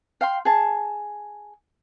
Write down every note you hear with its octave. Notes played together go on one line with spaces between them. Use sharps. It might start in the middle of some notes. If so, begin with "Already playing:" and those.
F5 G5 C6
G#4 A5